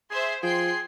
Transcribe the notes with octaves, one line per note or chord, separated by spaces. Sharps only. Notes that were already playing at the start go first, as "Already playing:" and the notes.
G#4 C5 E5 C6
F3 G#4 G5 C6 C7